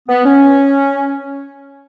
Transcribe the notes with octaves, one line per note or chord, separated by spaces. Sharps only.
B3
C#4